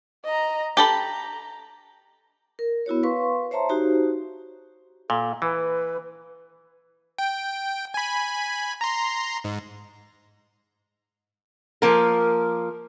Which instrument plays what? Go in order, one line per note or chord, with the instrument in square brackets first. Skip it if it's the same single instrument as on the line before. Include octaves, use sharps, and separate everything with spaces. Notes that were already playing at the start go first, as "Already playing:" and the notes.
[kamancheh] D#5 A#5
[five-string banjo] G4 A4 B5 [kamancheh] A#5
[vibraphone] A#4
B3 E4 F#4 C#5
B4 F5 C6 C#6
C5 C#5 E5 A5 A#5 C6
D#4 F#4 G4 C5
[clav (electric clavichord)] A#2 [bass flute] A4
[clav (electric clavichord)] E3 [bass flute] B4
[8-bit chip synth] G5
G#5 B5
A#5 C6
G#2
[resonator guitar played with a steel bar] F3 A#3 A#4